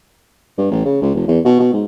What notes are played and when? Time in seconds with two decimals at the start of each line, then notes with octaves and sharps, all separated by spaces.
0.58 G2
0.71 A1
0.85 C#3
1.02 C#2
1.15 F1
1.28 E2
1.45 B2
1.60 B2
1.73 G#2